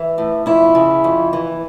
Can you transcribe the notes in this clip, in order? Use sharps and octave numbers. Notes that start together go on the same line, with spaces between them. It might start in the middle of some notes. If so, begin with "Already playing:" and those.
Already playing: E3
A2
F2 E4
C#3
F2
E3